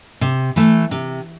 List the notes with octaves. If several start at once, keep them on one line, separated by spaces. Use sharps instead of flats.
C3
E3 A3
C3